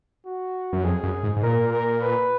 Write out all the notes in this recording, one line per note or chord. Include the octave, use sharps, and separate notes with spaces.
F#4
F#2
F2 G#4
F#2
G#2
G#2
A#2 A#4
A#4
B4